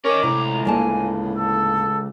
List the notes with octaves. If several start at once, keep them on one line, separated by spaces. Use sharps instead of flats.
C#4 A#4 D#5 D6
C#2 A2 C3 A#5
D2 A#3 G#5 A5
A4